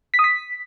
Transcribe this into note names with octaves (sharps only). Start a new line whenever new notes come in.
B6
D#6
B6